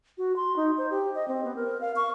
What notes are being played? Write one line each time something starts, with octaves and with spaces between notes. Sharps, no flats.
F#4
C6
D#4
C5
G4
D#5
C4
B3
A#4
F5
C#6